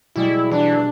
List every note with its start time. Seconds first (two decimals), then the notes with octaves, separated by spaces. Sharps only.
0.16 B2 G3 G#3 E4
0.52 E3 D4